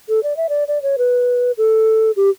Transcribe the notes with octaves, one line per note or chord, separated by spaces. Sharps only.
A4
D5
E5
D5
D5
C#5
B4
A4
G4